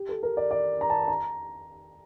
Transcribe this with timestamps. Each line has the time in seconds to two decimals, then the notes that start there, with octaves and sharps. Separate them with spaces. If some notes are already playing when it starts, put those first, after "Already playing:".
Already playing: G4
0.09 A4
0.23 A#4
0.37 D5
0.51 D5
0.81 A#5
0.90 A5
1.08 A#5